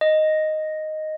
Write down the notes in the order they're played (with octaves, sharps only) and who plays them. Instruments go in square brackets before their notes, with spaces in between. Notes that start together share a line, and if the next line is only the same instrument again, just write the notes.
[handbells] D#5